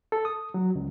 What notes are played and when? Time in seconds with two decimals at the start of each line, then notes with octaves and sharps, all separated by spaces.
0.12 A4
0.25 D#6
0.54 F#3
0.75 C#2